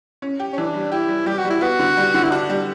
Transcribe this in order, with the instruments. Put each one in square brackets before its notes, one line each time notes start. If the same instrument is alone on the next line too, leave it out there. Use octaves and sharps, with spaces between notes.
[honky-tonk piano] C#4
G4
[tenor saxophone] C#4
[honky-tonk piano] E3 [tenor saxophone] D4
[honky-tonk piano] G3
[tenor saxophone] E4 [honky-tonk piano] G4
[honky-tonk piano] G3
[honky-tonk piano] G3 [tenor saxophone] G4
[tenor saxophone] F#4
[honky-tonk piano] G3
[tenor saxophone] E4
[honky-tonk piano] B3 [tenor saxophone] F#4
[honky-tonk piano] D3
G3
D3
[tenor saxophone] E4
[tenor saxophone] D4 [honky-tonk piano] F#4
[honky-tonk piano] G3